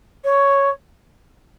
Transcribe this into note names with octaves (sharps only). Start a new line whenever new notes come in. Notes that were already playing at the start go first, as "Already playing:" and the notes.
C#5